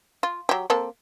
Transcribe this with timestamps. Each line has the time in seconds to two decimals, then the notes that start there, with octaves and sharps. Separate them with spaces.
0.23 F4
0.49 F#3 G4
0.70 A#3 C4 A4